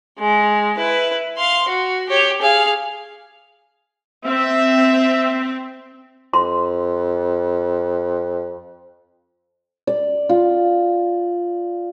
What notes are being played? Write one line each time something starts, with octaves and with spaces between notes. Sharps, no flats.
G#3
E4 B4
F5 C6
F#4
G4 C#5
G#4 F5
C4 E5
F2 C6
D5
F4